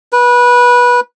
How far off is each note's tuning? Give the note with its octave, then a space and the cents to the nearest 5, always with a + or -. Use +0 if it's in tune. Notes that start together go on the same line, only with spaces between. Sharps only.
B4 -20